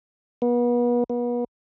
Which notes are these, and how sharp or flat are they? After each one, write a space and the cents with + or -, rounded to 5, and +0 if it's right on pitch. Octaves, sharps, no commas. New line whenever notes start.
B3 -35
B3 -35